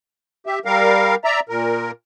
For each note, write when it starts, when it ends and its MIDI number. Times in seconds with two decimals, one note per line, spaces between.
0.46 0.59 67
0.46 0.59 76
0.65 1.15 55
0.65 1.15 70
0.65 1.15 77
1.24 1.40 74
1.24 1.40 76
1.24 1.40 82
1.49 1.91 46
1.49 1.91 70